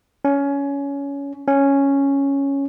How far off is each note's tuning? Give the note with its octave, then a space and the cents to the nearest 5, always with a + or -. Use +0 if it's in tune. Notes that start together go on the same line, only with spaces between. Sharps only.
C#4 +20
C#4 +0